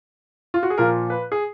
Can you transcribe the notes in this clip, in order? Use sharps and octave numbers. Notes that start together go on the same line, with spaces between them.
F4
F#4
G#4
A#2 F3 A#4
B4
G#4